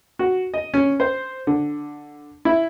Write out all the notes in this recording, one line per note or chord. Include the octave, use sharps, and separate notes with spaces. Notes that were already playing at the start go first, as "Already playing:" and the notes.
F#4
D#5
C#4
C5
D3
E4